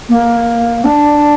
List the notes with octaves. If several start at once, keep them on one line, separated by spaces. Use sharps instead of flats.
A#3
D4